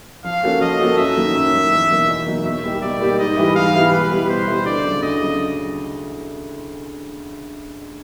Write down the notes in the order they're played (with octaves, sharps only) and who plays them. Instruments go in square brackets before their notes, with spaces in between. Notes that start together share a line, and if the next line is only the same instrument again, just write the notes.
[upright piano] F3 [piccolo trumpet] F5
[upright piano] A#3 C#4 F#4 A4
[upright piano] F3 [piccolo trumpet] D#5
[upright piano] A#3 C#4 F#4 A4
[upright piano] F#2 [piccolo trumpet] E5
[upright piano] D#3 F#3 A#3
F#2
D#3 F#3 A#3
E2
B2 F#3 A#3 D#4
E2
B2 F#3 A#3 D#4
[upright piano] B2 [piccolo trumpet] E5
[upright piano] G3 A#3 D#4 G4
[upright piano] B2 [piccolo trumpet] D5
[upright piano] G3 A#3 D#4 G4
[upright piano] G#2 [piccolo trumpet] D#5
[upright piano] E3 G3 B3 E4
[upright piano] G#2 [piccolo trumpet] F5
[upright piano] E3 G3 B3 E4
[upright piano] B2 [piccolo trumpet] B4
[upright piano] G3 B3 E4
[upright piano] B2 [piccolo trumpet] C5
[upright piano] G3 B3 E4
[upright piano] D2 [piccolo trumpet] D5
[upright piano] C#3 F#3
[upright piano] D2 [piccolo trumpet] D#5
[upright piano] C#3 F#3